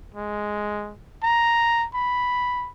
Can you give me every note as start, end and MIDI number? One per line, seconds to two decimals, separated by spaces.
0.15 0.94 56
1.23 1.86 82
1.94 2.69 83